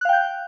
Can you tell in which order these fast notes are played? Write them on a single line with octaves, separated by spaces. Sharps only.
F#6 F5 G5 G6